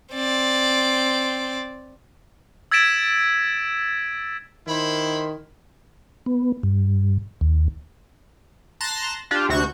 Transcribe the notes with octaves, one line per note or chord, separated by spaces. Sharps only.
C4 D5
E6 G#6 A6 B6 D7 E7
D#3 E4 C5 B5
B3
G2
D#2
A5 A#5 C6 F#6 A6 A#6
D4 F4 G4
D2 C3 F#4 C#6 G6 E7